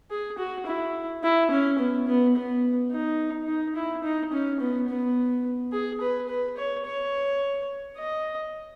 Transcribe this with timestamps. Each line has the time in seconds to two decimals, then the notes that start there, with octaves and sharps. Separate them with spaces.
0.11 G#4
0.38 F#4
0.66 E4
1.23 E4
1.51 C#4
1.79 B3
2.07 B3
2.35 B3
2.91 D#4
3.48 D#4
3.76 E4
4.03 D#4
4.33 C#4
4.60 B3
4.88 B3
5.72 G#4
6.01 B4
6.29 B4
6.57 C#5
6.86 C#5
7.97 D#5